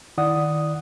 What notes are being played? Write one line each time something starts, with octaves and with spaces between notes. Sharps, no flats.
D#3 E4 D5 F#5 D#6